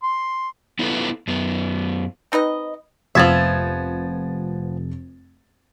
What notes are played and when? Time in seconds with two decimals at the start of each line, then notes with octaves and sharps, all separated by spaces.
0.03 C6
0.79 B3 E4 F4 G4 A4 B4
1.28 F#2 B3
2.32 C4 D#4 B4 D#5
3.15 F1 F3 B3 E5 G#6 A6